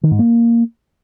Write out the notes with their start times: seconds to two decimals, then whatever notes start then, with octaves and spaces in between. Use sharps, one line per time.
0.03 D#3
0.11 G#2
0.19 A#3